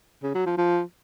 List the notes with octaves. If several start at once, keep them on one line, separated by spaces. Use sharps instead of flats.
C#3
F#3
F3
F3